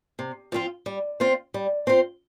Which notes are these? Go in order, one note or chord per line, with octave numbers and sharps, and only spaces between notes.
C3
F3 C4 F4
G3
C4 F4 C5
G3
C4 F4 C5